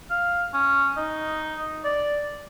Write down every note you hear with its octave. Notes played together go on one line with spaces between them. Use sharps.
F5
C#4
D#4
D5